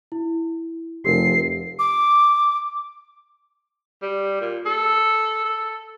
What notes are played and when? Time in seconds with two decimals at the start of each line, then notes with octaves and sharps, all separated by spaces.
0.12 E4
1.05 F1 G4 A#4 C7
1.79 D6
4.02 G3
4.41 A#2
4.66 A4
5.45 A4